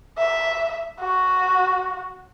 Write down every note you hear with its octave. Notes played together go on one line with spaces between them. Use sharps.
E5
F#4